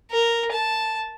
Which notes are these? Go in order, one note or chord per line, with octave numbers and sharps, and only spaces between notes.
A#4
A5